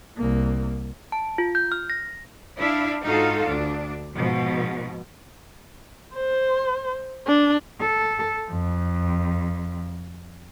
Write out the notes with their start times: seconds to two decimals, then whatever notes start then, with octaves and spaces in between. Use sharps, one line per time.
0.18 C2 A#3
1.12 A5
1.38 F4
1.55 G6
1.72 F6
1.90 A#6
2.58 D4 E4 E5 F5
3.04 G#2 D#4 F4 F#4 A4 F5
3.48 D2 D4
4.14 G#2 B2 F3
6.14 C5
7.27 D4
7.81 A4
8.51 F2